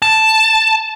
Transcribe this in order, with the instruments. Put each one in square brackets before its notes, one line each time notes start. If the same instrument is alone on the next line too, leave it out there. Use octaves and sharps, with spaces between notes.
[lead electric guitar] A5